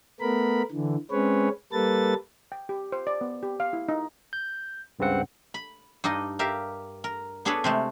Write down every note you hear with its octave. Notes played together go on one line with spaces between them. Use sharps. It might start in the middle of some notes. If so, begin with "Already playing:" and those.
A3 B3 A#4 B5
D3 E3
G#3 C4 C#4 B4 C#5
G3 A#3 A4 B4 A6
G5
G4
C5
D5
B3
G4
F5
E4
D#4
G6
C#2 G2 C#3 C4 F#5
B5
G2 D4 D#4 D#5
G4 A#4 E5 F5
A#4
B3 D4 G#4 A4 B4 C#5
C3 G#3 A3